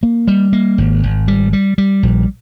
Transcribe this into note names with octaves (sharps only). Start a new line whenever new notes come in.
A#3
G3
A#3
G#1
G#1
G3
G3
G3
A#1